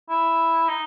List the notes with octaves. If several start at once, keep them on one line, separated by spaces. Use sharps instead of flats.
E4
D#4